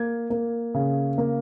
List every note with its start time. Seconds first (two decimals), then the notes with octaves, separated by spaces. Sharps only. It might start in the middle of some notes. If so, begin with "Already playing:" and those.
Already playing: A#3 G#6
0.30 A#3
0.74 C#3
1.18 A#3